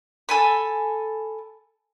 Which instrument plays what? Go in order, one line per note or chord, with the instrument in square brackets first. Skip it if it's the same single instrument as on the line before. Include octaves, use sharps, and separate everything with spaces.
[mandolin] A4 G#5 B5